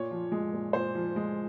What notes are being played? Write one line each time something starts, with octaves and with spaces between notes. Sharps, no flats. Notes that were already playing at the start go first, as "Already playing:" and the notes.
Already playing: A#2 C#5
F3
G#3
A#2
A#2 C5
F3
G#3